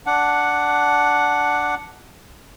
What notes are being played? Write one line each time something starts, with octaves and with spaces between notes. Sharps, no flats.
D4 F#5